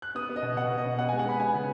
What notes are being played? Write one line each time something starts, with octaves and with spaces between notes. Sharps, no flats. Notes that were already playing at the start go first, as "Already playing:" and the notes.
F#6
B3 D#6
B3
D#5
B2
B2 F#5
B3
D#5
B2
B3 F#5
G#5
G#3
F#5
B3 B5
B3 G#5
C#3